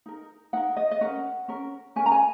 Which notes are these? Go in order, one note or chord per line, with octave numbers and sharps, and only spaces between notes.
D#4 A#4
D#4 A#4 F#5
D#5
D#5
C#4 A#4 F#5
C#4 A#4
C#4 A#4 G#5
A#5
G#5